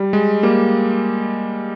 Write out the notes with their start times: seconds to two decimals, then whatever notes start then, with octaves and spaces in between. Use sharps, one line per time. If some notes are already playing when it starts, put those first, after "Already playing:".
Already playing: G3
0.13 G#3
0.43 G3 A#3